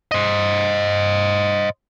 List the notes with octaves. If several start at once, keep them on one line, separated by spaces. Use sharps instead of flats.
C5 D#5